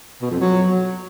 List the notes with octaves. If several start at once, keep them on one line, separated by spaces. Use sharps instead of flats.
B2
F2
F#3